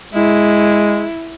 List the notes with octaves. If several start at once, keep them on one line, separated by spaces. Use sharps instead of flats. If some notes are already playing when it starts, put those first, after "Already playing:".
G#3 E4